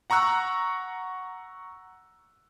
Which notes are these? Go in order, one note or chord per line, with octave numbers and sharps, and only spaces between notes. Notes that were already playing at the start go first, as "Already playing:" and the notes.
F#5 A#5 C#6 E6 F#6